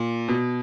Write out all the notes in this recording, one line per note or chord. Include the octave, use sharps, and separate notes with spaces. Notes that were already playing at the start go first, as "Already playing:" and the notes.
Already playing: A#2
B2